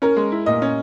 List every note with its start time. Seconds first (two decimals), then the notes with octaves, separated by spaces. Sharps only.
0.02 C#4 A#4
0.16 G#3
0.32 E4
0.46 A#2 D#5
0.62 C#4